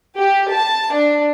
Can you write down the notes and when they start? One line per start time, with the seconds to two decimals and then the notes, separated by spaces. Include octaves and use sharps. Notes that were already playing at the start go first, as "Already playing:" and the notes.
0.16 G4
0.49 A5
0.90 D4